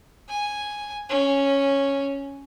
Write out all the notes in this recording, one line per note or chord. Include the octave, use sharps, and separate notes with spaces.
G#5
C#4